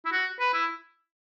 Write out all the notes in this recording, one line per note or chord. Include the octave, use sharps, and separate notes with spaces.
E4
F#4
B4
E4